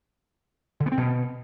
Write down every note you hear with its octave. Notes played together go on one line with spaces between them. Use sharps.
D3
B3
C4
B2